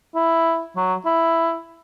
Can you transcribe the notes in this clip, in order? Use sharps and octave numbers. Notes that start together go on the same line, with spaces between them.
E4
F#3
E4